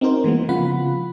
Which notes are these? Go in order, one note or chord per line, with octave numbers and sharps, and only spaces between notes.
C4 D#4 F#4 A#4 C5
E3 G#3 A#3 B3
C#3 F3 F4 F#5 B5